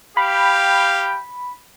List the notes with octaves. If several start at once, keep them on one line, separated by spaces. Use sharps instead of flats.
G4 F5 G5 B5